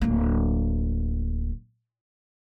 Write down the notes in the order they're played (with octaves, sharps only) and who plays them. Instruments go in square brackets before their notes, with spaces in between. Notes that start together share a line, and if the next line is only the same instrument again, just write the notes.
[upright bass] D1 A#3